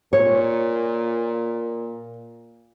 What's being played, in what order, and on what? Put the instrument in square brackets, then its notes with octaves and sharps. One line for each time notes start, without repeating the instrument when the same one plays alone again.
[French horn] A#2 [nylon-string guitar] C#5